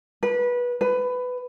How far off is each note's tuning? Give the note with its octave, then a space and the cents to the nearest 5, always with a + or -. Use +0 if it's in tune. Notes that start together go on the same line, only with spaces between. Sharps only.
B4 -20
B4 +15